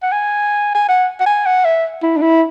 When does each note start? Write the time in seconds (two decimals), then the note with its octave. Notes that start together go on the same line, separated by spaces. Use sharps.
0.03 F#5
0.12 G#5
0.75 G#5
0.88 F#5
1.20 F#5
1.26 G#5
1.46 F#5
1.65 E5
2.03 E4
2.17 D4
2.22 E4